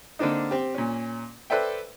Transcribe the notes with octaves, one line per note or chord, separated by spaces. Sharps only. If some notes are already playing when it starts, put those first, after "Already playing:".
D3 A#3 C4 D4 D#4
C4 G4
A#2 C#4
A4 B4 C5 D5 E5 G5